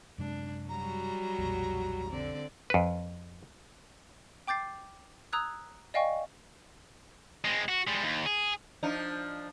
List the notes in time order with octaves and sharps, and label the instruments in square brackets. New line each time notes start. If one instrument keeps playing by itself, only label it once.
[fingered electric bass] F#2 C3 G#3 [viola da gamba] D4
[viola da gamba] F#3 G3 F#4 [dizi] A#5
[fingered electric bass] B1 F2 A#2
[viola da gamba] D3 C4 D5
[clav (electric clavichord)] F2 B4
[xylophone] G5 D6 G6 A6 C7
A#5 D#6 E6 F#6 G#6
D5 D#5 F5 G5 G#5 C#6
[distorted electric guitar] G#3 C4
F#4
G3 G#3
D#2
G#4
[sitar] F3 D4 D#4